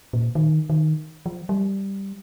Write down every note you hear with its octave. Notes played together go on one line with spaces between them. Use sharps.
A#2
D#3
D#3
F3
G3